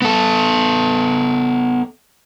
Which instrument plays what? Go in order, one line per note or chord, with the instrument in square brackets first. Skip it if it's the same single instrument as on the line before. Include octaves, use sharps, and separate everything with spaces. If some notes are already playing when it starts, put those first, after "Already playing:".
[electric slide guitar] B3 A4